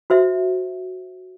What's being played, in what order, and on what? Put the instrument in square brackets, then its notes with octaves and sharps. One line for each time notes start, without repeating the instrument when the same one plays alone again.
[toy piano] F#4 C5 E5